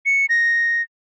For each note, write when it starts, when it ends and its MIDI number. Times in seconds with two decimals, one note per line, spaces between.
0.06 0.26 97
0.29 0.82 94